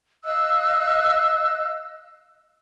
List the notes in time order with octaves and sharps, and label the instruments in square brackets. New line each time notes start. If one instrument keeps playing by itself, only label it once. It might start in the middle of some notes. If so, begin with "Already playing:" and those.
[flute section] D#5 F5 E6 F#6